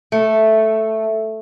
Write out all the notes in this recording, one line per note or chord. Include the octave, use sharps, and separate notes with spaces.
A3